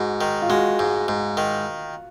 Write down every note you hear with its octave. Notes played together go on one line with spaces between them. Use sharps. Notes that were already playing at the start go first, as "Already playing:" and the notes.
Already playing: G#2 F#4
D#3
F4
G#3 F#4
G#2
G#2
D#3